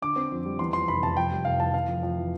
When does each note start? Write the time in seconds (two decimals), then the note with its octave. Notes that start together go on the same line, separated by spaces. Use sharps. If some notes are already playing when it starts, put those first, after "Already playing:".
0.02 D3 D6
0.16 C4
0.32 F2
0.45 G3
0.59 E2 C6
0.73 F3 C6
0.88 F1 B5
1.03 C3 A5
1.17 F2 G5
1.31 G3
1.45 F1 F5
1.60 E3 A5
1.74 C3 F5
1.88 F2
2.03 F2
2.18 E3